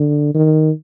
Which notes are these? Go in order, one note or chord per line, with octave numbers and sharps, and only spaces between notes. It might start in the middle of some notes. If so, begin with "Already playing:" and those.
Already playing: D3
D#3